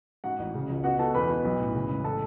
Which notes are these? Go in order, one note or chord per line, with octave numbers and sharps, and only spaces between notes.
G#2 F#4 F#5
A1
C#3
C#2
B2 F#4 F#5
B2 A4 A5
E2 B4 B5
B2
B1
A2
C#3
E1
A2 A4 A5